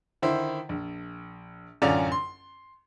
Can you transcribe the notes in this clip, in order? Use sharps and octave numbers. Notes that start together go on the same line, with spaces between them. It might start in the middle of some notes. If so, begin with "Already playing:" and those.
D3 D#3 E4 C5
A#1
A1 F#2 D3 C#4 F4 D5
C6